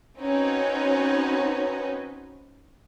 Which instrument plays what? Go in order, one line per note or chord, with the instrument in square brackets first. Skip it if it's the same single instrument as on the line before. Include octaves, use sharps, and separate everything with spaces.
[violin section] C4 C#4 D#4 F#4 B4 C#5